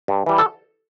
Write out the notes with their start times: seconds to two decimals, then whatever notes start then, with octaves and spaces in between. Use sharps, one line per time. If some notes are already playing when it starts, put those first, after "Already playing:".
0.08 G2
0.26 E3 G3
0.38 A4